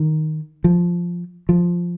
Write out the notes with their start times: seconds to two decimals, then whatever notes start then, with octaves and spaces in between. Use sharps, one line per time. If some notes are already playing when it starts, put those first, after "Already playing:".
Already playing: D#3
0.64 F3
1.49 F3